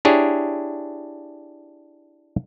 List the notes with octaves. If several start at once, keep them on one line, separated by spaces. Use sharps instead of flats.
D4 E4 G4 G#4 C#5